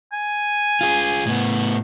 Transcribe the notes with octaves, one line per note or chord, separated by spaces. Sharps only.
G#5
F4 G#4
A2 B3